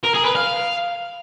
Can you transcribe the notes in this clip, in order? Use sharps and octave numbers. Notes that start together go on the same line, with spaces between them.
A#4
G#4
B4
F5